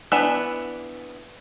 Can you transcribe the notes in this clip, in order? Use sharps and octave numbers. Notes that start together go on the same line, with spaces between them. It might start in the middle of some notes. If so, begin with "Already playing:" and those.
E3 B3 D4 E5